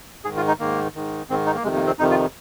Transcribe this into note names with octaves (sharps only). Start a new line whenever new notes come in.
G#2 D#3 G#4
F4
D#4
G#2 D#3 A#3
G#2 D#3
G#2 D#3 C4
D#4
A#3
F2 C3 D#3 G#3
A#3
C4
F2 C3 D#3 D#4
F4